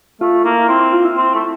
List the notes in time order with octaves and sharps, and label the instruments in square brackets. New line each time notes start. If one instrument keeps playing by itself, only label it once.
[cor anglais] A3 [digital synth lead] F4
[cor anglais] A#3 [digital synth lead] E4
[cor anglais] C4 [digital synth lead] E4
[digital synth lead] E4
F4
E4
[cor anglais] C4
A3